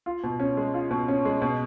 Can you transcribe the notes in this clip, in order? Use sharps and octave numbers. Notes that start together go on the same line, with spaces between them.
F4
B2
C#4
G#3
F4
B2
C#4
G#3
B2